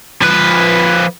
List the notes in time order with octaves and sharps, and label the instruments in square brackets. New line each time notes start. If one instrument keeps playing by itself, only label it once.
[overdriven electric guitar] F3 B4